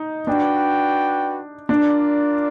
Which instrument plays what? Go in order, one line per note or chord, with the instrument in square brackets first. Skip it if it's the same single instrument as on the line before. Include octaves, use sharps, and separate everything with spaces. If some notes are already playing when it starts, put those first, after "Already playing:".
Already playing: [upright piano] D#4
[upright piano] D4 [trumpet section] F#4 B4 D5 G5
[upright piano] D4 [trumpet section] F4 A#4 D5